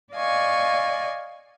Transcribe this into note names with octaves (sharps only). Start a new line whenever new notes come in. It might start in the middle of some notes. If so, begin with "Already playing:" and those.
D5 D#5 F5 G#5 C#6